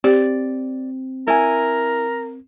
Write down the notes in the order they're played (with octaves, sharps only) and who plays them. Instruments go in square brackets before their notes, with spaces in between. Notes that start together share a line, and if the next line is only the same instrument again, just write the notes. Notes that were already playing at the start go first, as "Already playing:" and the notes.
[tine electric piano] C4 [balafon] G4 [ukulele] D5
[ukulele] E4 G#5 [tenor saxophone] A#4